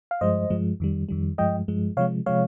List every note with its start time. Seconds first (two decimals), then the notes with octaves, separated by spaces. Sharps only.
0.11 F5
0.21 G2 F3 G#3 C5 D#5
0.50 G2 F3 G#3
0.80 F2 D#3 G3
1.09 F2 D#3 G3
1.38 G2 F3 G#3 D#5 G5
1.68 G2 F3 G#3
1.97 C3 F3 G#3 C#5 F5
2.26 C3 F3 G#3 C#5 F5